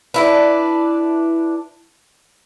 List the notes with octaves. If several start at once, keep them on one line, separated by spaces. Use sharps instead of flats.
D4 E4 B4